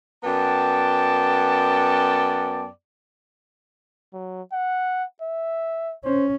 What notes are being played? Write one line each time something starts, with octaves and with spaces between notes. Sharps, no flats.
F#2 B3 D5 G5 A5
F#3
F#5
E5
C#4 C5